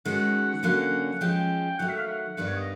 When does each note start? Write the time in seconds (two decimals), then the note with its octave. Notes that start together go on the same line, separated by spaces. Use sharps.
0.05 D#3 G#3 C#4 F#4 F#5
0.63 D3 F#3 A#3 C#4 F#5
1.21 F3 G#3 C#4 G5
1.78 D#3 F#3 A3 F#5
1.89 E5
1.98 F5
2.07 F#5
2.37 G2 D#3 G3 B3 F#5
2.46 C#5
2.56 D#5